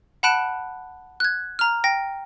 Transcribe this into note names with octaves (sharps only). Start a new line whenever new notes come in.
F#5 A5 B5 F#6 D7 E7
F#6 G#6
A#5 F6
G5 A#6